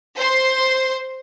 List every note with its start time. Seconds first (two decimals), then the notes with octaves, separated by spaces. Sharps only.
0.17 C5 C6